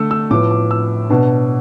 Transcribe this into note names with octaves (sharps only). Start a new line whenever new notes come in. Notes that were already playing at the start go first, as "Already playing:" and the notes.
Already playing: D3 A3 D4 E6
E6
A2 F3 B3 D6
D6
E6
B2 B3 D4